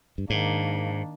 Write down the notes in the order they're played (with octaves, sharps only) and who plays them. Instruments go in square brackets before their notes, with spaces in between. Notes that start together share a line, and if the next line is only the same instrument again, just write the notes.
[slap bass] G2
[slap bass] G#2 [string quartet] D#3 A#3 D4